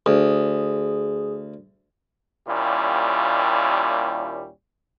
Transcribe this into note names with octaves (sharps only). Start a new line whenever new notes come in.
D2 G#4
D#2 A#2 G3 C#4 E4